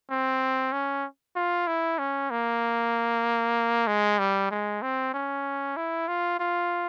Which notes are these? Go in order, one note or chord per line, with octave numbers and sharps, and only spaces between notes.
C4
C#4
F4
E4
C#4
A#3
G#3
G3
G#3
C4
C#4
E4
F4
F4